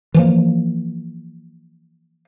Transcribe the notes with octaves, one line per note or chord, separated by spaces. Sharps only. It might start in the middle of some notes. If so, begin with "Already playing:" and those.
E3 F3 A#3